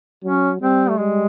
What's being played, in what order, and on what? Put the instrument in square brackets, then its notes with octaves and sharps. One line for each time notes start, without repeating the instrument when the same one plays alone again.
[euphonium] F#3 [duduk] C#4
[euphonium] G3 [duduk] C4
[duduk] A3
[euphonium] G3 [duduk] G#3